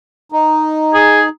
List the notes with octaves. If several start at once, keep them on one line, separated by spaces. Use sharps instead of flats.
D#4
G#4